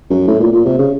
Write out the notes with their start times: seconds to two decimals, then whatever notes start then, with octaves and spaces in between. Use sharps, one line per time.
0.10 F#2
0.28 A2
0.40 A#2
0.53 A#2
0.65 C3
0.78 C#3